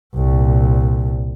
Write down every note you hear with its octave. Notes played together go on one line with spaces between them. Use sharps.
C2 A#2